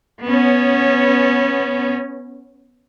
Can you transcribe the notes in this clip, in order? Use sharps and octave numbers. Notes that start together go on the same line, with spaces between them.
B3 C#4